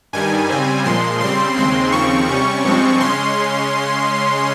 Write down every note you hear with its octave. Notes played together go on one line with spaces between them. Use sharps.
G2 D#3 G3 G#5
C#3 G3 C4
A#2 F3 G#3 C6
C#3 G3 C4 C6
D#2 C#3 G#3 C4 C6
D#2 C#3 F3 C4 C#6
C3 G3 C#4
G2 F3 G#3 C4
C#3 G#3 C#4 C6